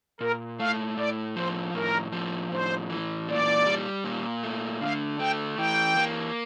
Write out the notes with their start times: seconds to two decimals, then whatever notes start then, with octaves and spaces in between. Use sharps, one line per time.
0.21 A#2 A#4
0.59 A3 F5
0.97 A2 D5
1.36 F3 C5
1.74 A2 A#4
2.12 F3
2.51 A2 C5
2.90 E3
3.28 A#2 D5
3.66 G3
4.04 A#2
4.43 A3
4.81 D3 F5
5.19 A3 G5
5.58 E3 G5
5.97 A#3